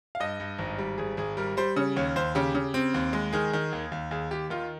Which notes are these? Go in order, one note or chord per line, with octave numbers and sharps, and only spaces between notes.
F5
G2 D#5
G2
G#1
G3
G#1 G#4
G#1 G#4
G3 A#4
G3 C5
C#3 C#5
D#2 C#5
D#2 C5
C#3 G4
C#3
C4
D#2
G#3
D#3 G#4
D#3
D#2
D#2
D#2 G#4
D#2 G4
D#3 F4